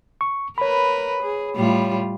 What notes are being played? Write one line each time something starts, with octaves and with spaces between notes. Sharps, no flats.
C#6
A#4 B4 C#5 B5
G#4
A2 G3 F4